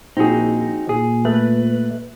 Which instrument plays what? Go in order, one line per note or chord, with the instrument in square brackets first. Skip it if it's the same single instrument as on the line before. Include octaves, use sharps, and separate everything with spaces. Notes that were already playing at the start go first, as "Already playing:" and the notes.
[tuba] A#1 [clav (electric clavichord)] C4 G#4 [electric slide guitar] D#4 F#4
[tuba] A#2 [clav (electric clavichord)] G#4
[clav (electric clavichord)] A3 [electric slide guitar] B4